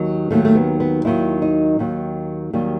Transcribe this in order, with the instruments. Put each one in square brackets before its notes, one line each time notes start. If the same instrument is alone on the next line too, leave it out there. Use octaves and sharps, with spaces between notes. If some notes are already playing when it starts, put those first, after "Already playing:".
Already playing: [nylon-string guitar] D#2 D#3 F#3
D#2 D#3 F#3 A3
A3
B3
B3
D#2 D#3 F#3 E4
D#4
D#2 D#3 F#3
D#2 D#3 F#3 G3